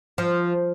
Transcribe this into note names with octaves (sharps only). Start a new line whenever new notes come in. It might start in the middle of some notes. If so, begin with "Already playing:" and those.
F3